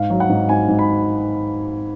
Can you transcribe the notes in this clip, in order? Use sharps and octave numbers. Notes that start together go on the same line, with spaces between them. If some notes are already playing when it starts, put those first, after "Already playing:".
Already playing: G#2 F5
F#3
F#5
G#2
G#2 G#5
G#2
B5